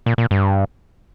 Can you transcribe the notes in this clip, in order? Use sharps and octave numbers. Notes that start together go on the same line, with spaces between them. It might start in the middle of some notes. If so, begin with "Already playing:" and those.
A#2
A#2
G2